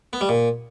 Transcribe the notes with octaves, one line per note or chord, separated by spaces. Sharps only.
B3
G3
A#2